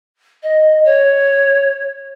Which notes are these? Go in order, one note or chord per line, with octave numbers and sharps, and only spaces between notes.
D#5
C#5